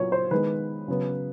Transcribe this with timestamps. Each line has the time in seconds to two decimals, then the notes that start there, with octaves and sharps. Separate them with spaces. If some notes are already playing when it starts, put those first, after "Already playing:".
Already playing: A#2 F#3 B3 C#5
0.12 C5
0.31 D#3 G#3 B3 B4
0.88 C#3 F#3 B3